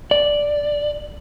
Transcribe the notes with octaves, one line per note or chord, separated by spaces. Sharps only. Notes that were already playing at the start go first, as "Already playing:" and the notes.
D5